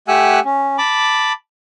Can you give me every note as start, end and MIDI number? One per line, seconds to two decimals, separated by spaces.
0.08 0.40 57
0.08 0.40 67
0.08 0.40 78
0.08 0.40 80
0.08 0.40 88
0.08 0.40 90
0.45 0.77 61
0.78 1.32 81
0.78 1.32 83
0.78 1.32 86